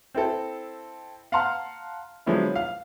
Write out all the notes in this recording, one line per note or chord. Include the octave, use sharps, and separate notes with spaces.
C4 E4 A4
F5 F#5 A5 A#5 C6 F6
D3 F3 F#3 G#3 B3 E4
F5